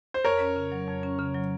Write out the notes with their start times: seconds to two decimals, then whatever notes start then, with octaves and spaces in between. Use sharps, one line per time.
0.14 C5
0.24 F2 A#4 C#5
0.40 C#4
0.56 C#3
0.72 F#3
0.88 F2
1.03 C#4
1.19 C#3
1.34 F#3